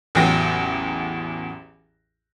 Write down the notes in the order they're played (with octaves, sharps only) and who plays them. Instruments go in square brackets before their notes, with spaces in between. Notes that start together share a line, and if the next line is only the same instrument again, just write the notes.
[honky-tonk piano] A1 E2 F#3 G5 A#6